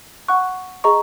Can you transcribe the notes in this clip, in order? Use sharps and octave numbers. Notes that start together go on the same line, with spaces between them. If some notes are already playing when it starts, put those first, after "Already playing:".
F#5 C#6 F#6
G#4 D#5 A#5 C#6